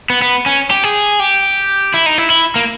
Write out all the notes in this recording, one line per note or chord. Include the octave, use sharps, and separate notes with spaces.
B3
B3
C#4
G4
G#4
G4
E4
D#4
E4
E4
A#3